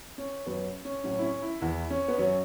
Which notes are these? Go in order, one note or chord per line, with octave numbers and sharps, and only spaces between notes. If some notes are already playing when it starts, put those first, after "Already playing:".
C#4
F#2 F#3 B3
C#4
A2 F#3 C#4
E4
C#4
E4
E2 E3 E4
C#4
B3
F#2 F#3 C#4